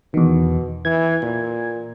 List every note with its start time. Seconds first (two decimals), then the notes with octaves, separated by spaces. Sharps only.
0.14 E2 B2 D#3
0.85 E3 G#6
1.23 A#2